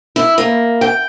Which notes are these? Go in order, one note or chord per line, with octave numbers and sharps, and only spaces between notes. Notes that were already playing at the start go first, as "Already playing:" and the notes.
E4
A#3
G5